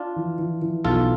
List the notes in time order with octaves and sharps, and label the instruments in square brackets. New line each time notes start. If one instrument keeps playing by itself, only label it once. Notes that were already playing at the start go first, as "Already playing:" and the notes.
Already playing: [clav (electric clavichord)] D4 F4
[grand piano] E3
E3
E3
[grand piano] B1 [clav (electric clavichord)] F4 A4